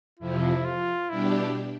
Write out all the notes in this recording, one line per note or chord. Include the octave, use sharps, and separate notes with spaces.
F2 C3 F3 E4
F4
B2 G3 D4 E4 G4